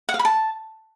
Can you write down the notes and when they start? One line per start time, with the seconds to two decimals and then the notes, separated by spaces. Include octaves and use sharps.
0.09 F#5
0.14 F5
0.19 B5
0.25 A5